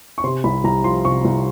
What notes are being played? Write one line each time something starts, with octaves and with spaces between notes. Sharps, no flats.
C#6
C3 C6
C2 B5
C2 A#5
F3 C6
C3 C#6
C2